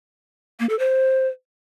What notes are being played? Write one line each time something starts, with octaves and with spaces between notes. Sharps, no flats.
A#3
A4
C5